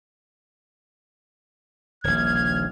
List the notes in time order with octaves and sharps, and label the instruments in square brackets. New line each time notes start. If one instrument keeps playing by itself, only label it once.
[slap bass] D#1 A#1 [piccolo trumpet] F6 [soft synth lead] G#6